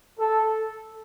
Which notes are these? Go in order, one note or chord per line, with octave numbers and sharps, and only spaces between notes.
A4